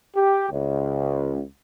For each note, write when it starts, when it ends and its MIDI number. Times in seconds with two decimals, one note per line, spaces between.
0.16 0.48 67
0.50 1.41 37